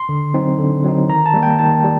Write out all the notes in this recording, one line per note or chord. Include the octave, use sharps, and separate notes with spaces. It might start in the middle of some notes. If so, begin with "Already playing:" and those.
Already playing: C6
D3
F#3 C4 D#4
D3
F#3 C4 D#4
D#3 A#5
A5
G3 A#3
G5
D#3 A5
G3